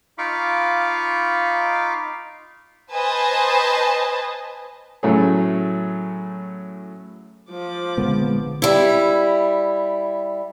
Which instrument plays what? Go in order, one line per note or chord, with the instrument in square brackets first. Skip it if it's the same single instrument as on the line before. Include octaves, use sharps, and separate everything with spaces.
[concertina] D#4 F4 F5 B5 C#6 D6
[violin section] B4 C5 D#5 G#5 A5
[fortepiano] A2 F#3 A3 C#4 G#4
[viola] F3 D6
[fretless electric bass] A#1 B3 [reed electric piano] D3 G#3
[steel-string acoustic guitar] G3 E4